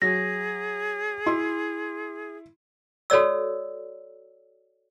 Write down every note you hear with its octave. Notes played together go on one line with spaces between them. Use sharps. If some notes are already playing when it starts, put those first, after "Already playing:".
F#3 G#4 A#6
E4 C6
F#4 A4 C#5 D5 E6